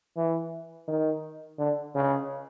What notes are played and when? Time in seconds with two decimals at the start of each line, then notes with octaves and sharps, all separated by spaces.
0.16 E3
0.88 D#3
1.59 D3
1.96 C#3